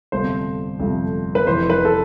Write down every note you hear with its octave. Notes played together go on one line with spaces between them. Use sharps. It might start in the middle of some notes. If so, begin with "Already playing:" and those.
G1 F2 C3 F3 A3 C5
G1 F2 C3 F3 A3
B4
F1 F2 E3 C5
B4
A4